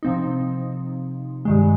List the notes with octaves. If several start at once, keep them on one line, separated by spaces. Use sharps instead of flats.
C3 F3 C4 D#4
G2 D#3 G#3